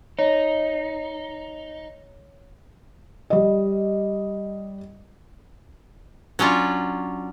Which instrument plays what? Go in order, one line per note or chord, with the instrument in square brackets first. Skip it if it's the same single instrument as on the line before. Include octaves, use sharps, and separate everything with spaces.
[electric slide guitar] D#4 [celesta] C#5
[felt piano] G3 D#5
[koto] F#3 C#4 D4 F4